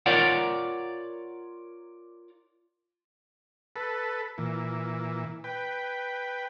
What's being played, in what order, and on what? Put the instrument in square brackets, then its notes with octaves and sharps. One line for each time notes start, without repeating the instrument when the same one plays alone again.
[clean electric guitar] F4 A#4 C#5 D5 F5 F#5
[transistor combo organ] A4 B4
A#2 E3
B4 G5